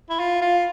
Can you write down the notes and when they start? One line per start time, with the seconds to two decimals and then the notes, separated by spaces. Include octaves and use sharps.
0.10 E4
0.19 F4
0.42 F4